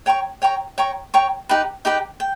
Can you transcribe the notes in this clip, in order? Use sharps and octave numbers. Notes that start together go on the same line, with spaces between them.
C#5 G5 A#5 C#6
C#5 G5 A#5 C#6
C#5 G5 A#5 C#6
C#5 G5 A#5 C#6
D#4 G4 B4 G5
D#4 G4 B4 G5
G5